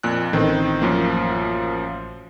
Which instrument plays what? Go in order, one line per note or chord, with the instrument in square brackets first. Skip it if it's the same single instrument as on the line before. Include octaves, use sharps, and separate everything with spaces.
[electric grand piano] F2 A#2 F#6
[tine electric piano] A1 [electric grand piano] D#3 C4 D#4
[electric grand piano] F#2 F3 A#3